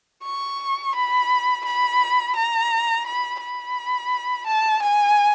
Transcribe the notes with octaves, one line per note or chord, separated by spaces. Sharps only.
C#6
B5
B5
A#5
B5
B5
A5
G#5